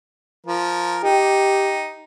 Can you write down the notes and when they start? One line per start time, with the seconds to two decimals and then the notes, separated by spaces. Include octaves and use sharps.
0.46 F3 A#4
1.03 D#4 G4